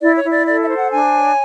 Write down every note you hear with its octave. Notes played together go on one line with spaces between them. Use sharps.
E4 D5
C#5
E4
D5
A4 D5
E5
C5
F#5
D4 G#5
C#5